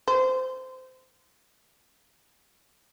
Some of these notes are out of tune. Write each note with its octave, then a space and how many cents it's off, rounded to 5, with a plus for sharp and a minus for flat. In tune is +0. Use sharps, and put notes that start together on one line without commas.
C5 -20